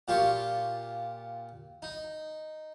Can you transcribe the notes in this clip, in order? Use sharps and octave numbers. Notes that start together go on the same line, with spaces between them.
A#2 F4 G4 C6 C#6
D#4